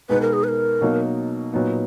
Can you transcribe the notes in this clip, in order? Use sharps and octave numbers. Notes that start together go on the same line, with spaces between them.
B2 G#3 B3 D#4 B4
A#4
G#4
B4
A#4
B2 F#3 A#3 D#4
A#2 F#3 B3 D#4